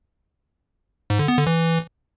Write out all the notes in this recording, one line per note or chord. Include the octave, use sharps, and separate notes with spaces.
G#2
D3
B3
D3
E3